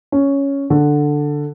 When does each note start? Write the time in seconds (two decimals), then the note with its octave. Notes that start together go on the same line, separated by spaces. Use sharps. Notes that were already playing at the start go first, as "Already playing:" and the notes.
0.12 C#4
0.70 D3